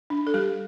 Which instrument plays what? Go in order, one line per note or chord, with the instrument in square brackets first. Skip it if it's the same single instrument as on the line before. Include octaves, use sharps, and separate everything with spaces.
[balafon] D4
A4
G3 G4